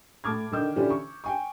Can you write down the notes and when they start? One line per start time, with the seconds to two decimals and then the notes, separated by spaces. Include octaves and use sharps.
0.24 A2 A5 D6 F6 G#6
0.51 D3 D#3 E6 G6
0.76 D3 E3 C#4 D4 F4 G4
0.90 C#6
1.24 G5 G#5 C#6